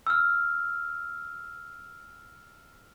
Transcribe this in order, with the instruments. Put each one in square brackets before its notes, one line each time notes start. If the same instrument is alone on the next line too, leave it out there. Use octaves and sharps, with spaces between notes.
[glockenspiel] E6 F6